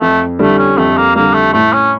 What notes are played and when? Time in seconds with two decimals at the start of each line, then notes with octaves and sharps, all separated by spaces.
0.01 F2 A3
0.39 D3 G3 A3
0.59 C#4
0.77 F2 A3
0.97 A#3
1.15 D3 G3 A#3
1.34 A3
1.53 A2 A3
1.73 C#4